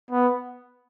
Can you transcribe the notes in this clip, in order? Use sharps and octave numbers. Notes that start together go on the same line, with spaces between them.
B3